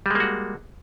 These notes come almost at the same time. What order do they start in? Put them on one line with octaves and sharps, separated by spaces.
G3 G#3 A#3 F#4